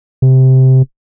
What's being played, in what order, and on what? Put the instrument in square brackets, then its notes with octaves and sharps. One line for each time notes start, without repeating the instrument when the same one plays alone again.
[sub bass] C3